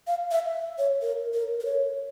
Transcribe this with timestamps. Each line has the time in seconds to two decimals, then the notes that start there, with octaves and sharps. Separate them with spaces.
0.07 F5
0.31 E5
0.78 C#5
1.02 A#4
1.34 A#4
1.60 A#4
1.65 C#5